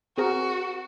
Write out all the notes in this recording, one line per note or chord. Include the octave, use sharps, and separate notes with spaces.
C4 F#4 G#4 A#4